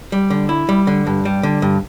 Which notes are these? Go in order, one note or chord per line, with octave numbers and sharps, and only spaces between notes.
G3
D3
E4
G3
D3
G2
G3
D3
G2